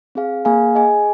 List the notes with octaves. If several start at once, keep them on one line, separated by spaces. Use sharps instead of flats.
C4 G#4 F5
A#3 G#4 F5 G#5
G#4 D#5 G#5